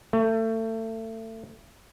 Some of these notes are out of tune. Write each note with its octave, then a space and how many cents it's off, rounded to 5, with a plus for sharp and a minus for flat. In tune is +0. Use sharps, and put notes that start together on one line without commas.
A3 +30